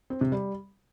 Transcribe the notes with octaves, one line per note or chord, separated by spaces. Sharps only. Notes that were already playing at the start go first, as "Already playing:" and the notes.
C4
C3
G3